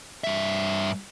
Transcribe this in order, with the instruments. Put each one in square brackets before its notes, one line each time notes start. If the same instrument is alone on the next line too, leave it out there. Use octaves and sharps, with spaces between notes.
[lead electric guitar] G2 E5